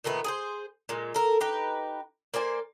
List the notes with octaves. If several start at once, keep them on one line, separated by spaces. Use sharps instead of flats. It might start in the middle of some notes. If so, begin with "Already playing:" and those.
A#2 D#3 A3 B3
G#4 A4 C5
A#2 G#3
A4 A#4
D#4 G4 B4
A#3 C5 D5 G#5